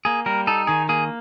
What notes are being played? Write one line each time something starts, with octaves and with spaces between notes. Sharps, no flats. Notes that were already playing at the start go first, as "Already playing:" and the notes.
A#3 G#4
G3 A#4
D#4 A4
D#3 G#4
A#3 G#4